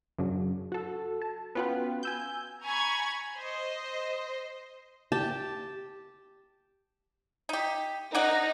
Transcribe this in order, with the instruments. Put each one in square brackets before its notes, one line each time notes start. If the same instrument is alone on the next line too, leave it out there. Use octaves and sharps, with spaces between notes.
[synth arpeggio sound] F#2 C#3 F#3 D4
F#4 A4
A5
B3 C#4 F4 F#4 B4 G5
G#5 E6 G6
[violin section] G#5 A#5 B5 C#6 G#6
C5 D#5
[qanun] G4 G5 A5
[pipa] D#4 G4
[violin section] D#4 [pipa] A#4 D5 F#5